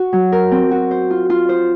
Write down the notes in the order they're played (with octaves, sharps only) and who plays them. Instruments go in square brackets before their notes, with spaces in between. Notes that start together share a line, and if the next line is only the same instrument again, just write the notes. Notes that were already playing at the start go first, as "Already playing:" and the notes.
Already playing: [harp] F#4
F#3
A#4
C4
F#4
C5
F4
F4
C5